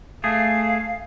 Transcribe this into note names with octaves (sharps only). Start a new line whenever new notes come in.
A3 G#4 F5